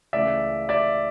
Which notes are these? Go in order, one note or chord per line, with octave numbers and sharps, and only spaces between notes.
C#2 C#3 E3 A3 D5 E5
D5 E5